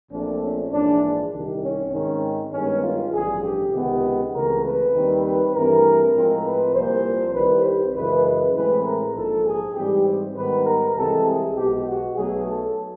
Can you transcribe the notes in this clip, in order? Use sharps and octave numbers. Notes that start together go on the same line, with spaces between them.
A#1 A#2 F3 A3 C4 D4
C#4
A#1 G#2 E3 G#3 D4
C2 C3 D#3
C#4
G#2 D#3 G#3 C4 C#4
G2 D#3 G#3 B3 C#4
F4
A1 G2 D3 F3 G#4
G4
C#2 C3 D#3 G#3 B3
C#2 C#3 E3 A3 C4 A#4
B4
D#2 D#3 G3 C4
B4
G2 E3 A3 C4 A#4
A2 F3 G#3 C4
B4
C2 A#2 F3 A#3 C5
C2 C3 D#3 G3 C4 B4
C5
F#2 C#3 E3 G#3 B4
B4
A2 E3 G#3 C4 B4
A#4
A#1 G#2 F3 A4
G#4
G#2 E3 G3 C4 G4
C5
G#2 D#3 G3 B3 B4
A#4
C2 C3 E3 G#3 C4 A4
G#4
B1 B2 G#3 G4
F#4
B1 B2 F#3 A3 G#4
A4